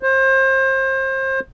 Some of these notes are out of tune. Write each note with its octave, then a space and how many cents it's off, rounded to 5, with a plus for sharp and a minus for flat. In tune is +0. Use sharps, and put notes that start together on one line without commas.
C5 +30